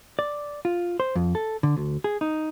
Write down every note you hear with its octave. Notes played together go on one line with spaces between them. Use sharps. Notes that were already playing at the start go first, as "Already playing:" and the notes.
D5
F4
C5
F2
A4
D3
D2
G#4
D#4